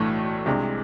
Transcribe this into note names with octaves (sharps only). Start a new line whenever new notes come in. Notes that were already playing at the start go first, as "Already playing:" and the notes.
Already playing: B1 A2 E3 A3 D4
C2 C3 G#3 D4